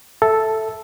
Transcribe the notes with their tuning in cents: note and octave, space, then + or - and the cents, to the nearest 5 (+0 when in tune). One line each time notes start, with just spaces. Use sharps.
A4 +0 E5 +0